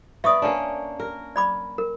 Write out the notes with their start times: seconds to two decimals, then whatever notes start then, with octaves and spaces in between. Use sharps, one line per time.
0.24 B3 D5 E5 C#6 D#6
0.42 A#3 C#4 D4
1.00 A#4
1.36 D5 B5 D6
1.78 A#4